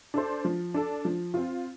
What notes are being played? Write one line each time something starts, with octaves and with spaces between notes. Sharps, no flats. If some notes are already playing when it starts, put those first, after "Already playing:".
D4 A4 C5
F3
D4 A4
F3
C4 F4